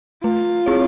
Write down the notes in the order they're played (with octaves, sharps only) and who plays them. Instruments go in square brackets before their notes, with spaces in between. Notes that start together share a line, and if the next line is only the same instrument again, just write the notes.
[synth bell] A3 [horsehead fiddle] F4
[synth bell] C4 E4 G#4 C#5